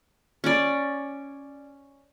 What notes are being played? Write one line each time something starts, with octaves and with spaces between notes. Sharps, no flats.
C#4 D5